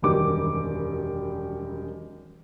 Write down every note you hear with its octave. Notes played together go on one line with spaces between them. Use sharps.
E1 F#2 D#3 G3 D6